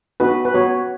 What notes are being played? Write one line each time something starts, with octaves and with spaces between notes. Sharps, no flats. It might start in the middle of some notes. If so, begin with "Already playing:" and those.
B3 D#4 F#4 B4
B4
B3 F#4 C#5